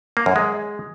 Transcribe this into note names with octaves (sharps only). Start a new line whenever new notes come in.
A#3
F#2
G#3